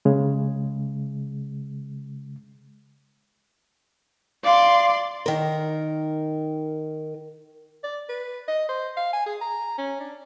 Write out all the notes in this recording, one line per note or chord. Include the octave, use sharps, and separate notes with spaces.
C#3 G#3
D5 F5 C6
D#3 A#4
D5
B4
D#5
C5
F5
G#5
G#4
A#5
C#4
D4